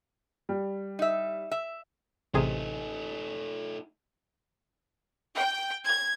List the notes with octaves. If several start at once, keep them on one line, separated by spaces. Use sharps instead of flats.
G3
D#4 E5
E5
A1 C3 A3 D#4 G#4
G5
G#6